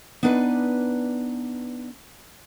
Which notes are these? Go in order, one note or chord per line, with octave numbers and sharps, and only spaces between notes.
B3 D4 D#4 B4 D5 G#5